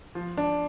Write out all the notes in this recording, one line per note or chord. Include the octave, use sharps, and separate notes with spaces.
F3
D4